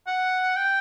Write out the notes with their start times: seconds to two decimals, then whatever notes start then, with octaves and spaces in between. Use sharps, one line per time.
0.07 F#5
0.56 G5